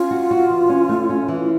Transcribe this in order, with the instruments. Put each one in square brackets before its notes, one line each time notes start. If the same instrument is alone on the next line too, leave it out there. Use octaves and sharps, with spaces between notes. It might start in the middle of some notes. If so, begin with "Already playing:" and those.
Already playing: [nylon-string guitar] C#4 [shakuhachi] F4
[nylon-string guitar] F#4
F#4
E3
C#4
A3
C#4
E3